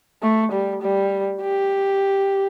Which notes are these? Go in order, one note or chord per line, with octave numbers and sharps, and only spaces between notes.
A3
G3
G3
G4